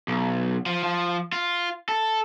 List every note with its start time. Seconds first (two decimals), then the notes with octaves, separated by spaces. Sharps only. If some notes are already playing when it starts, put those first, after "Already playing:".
0.08 B1
0.66 F3
0.83 F3
1.32 F4
1.89 A4